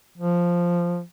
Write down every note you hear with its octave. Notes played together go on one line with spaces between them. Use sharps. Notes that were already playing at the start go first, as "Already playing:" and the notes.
F3